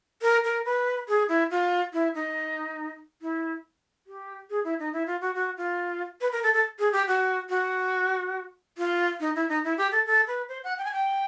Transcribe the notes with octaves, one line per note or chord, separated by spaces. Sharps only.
A#4
A#4
B4
G#4
E4
F4
E4
D#4
E4
G4
G#4
E4
D#4
E4
F4
F#4
F#4
F4
B4
A#4
A4
A4
G#4
G4
F#4
F#4
F4
D#4
E4
D#4
E4
G4
A4
A4
B4
C5
F#5
G5
G#5
G5